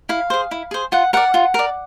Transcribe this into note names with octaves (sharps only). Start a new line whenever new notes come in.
E4 F5
G#4 C5
E4
G#4 C5
F4 F#5
A#4 D5 F#5
F4
A#4 D5